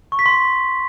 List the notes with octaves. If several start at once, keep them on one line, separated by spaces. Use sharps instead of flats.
C#6
B6
C6